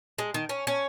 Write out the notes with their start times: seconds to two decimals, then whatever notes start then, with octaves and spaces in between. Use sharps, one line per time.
0.19 G#3
0.34 D#3
0.49 C#4
0.67 C#4